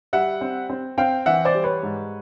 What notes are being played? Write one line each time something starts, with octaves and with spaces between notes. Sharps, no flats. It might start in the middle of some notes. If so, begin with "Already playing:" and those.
G3 E5 F#5
C4
C4
C4 F5 G5
E3 E5 F#5
C5 D5
G3
B4 C#5
G#2